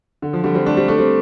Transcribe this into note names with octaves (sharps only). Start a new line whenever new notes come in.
D3
F3
D3 G3
G3 C4
A3 D4
G3 C4
A3 D4
G3 C4